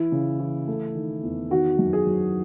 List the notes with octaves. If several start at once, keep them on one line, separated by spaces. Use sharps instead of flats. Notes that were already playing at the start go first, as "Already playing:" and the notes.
Already playing: E3 E4
C#3
E3
A3
D#3
E2
D#3 F#4
F#2
G#4
F#3